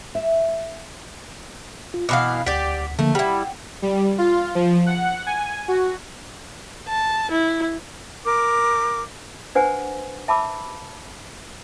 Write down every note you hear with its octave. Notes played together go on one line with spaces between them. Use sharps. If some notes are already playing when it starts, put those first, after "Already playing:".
E5
F4
B2 E3 F5 F#5 B5 D6
D2 G4 D5 F#5 B6
D3 F3 A3 A#3
G3 E4 F#5 G5
G3
F4
F3
F#5
G#5
F#4
A5
E4
A#4 D6
D4 B4 C5 F#5 G#5
E5 A5 B5 D6 E6